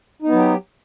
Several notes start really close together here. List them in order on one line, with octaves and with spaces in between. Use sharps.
D#4 B3 F#3 G4